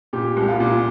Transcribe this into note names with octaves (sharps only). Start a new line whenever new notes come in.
A#2 G4
C2
G4
F4
A#2